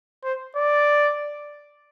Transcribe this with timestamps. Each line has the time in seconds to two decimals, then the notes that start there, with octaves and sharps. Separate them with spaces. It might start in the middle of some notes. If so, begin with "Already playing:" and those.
0.24 C5
0.56 D5